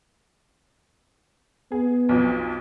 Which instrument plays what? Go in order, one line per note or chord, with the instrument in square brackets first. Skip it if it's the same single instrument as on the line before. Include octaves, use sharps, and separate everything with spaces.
[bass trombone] B3 [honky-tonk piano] G#4
[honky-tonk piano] B1 F2